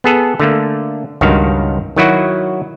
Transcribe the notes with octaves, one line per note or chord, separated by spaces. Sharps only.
B3 G#4 A4
D3 A3 A#3
C#2 G2 D#3 F#4 F5
D#3 F#3 E4 F#4